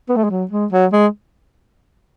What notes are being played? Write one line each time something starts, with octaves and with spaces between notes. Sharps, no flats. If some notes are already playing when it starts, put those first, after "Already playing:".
B3
A3
G#3
F#3
G#3
F#3
G#3